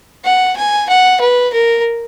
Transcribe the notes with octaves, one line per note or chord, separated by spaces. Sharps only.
F#5
G#5
F#5
B4
A#4